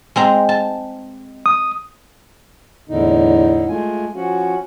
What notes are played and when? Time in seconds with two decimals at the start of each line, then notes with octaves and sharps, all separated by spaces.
0.16 G#3 C4 A#5
0.49 A5
1.46 D#6
2.89 E2 A2 D3 D#4
3.69 G#3 A3 F4 G#5
4.15 F3 C#4 F#4